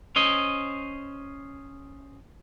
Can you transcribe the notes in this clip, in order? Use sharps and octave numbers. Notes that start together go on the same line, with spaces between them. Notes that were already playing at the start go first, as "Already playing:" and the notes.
C#4 C5 D#5